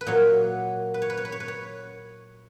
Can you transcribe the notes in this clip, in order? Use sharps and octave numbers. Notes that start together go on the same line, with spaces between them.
B4
A#2 F#3 C#5
B4
C#5
B4
C#5
B4
C#5
B4
C#5